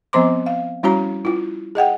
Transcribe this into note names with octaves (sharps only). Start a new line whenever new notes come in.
F3 B3 C4 C5 C6 D6
F5
G3 C#4 E4 F#4 C#5 A#5
E4 F4
G#4 D#5 F#5 G5